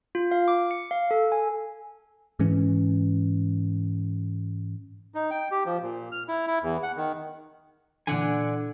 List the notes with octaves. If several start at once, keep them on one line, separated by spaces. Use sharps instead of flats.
F4
F5
D6
C#7
F5
A4
G#5
G#2 E3 C#4
D#4
G5
G4
F3
A#2
F6
E4
E4
E2
F#5
D#3
A#2 D3 E3 D5 F#5 G#5